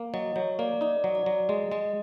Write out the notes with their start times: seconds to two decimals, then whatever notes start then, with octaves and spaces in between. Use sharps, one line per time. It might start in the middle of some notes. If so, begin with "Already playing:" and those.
Already playing: A#3
0.14 F#3 D#5
0.36 F#3 C#5
0.59 A#3 D5
0.81 D#4 D5
1.04 F#3
1.15 D5
1.26 F#3
1.49 G#3 D#5
1.72 G#3 D#5